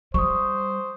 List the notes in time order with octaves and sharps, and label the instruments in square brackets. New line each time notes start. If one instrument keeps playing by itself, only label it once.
[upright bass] G3 [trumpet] C5 [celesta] C#6 D#6